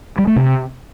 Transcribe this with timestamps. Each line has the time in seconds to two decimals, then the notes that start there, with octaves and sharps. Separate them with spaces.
0.18 G3
0.27 A3
0.36 C3